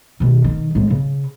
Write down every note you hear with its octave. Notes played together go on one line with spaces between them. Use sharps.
B2 D#3
D#3
A2 G#3
C#3